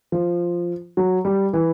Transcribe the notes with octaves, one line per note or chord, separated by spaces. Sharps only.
F3
F#3
G3
E3